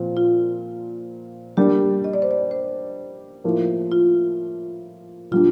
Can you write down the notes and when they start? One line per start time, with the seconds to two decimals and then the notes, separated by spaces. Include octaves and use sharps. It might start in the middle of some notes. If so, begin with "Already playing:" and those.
Already playing: A#2 F3 C4
0.17 F4
1.57 G3 A#3 D4 G4
2.04 D#5
2.14 D5
2.22 C5
2.31 D5
2.51 C5
3.44 A2 F3 A#3
3.92 F4
5.31 A#2 G3 D4 F4